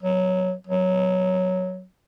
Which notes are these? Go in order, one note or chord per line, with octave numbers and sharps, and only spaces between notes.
F#3
F#3